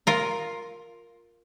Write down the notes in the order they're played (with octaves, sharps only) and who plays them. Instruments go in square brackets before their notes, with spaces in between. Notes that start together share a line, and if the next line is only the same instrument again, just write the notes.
[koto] F4 A#4